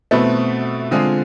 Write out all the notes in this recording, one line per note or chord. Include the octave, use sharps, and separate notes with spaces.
B2 A3 C4 E4 B4
D3 G#3 C4 F4 G#4